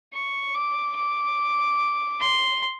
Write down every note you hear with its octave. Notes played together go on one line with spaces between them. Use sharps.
C#6
D6
D6
C6